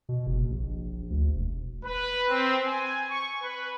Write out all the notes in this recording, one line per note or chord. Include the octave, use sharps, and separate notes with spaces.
B2
F#1
A#1
D2
E1
B4
C4
G#5
C#6
B4